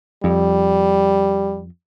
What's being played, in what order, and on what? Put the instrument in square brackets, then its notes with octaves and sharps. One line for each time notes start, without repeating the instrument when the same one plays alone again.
[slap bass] F2 [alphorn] G3